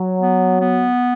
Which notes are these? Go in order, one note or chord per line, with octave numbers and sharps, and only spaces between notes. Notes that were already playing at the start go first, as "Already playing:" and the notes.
Already playing: F#3
B3
B3